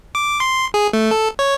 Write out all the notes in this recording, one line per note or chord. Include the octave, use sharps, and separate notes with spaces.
D6
C6
G#4
A3
A4
C#5